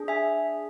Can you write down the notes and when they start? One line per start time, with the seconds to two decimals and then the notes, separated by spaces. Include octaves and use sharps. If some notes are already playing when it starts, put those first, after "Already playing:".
Already playing: D4 G#4
0.08 E5 G#5